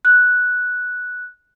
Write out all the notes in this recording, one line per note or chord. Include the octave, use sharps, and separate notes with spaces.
F#6